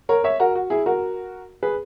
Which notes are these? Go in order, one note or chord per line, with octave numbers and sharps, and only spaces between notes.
A#4 C#5
C#5 E5
F#4 A#4
F#4
E4 G#4
F#4 A#4
G#4 B4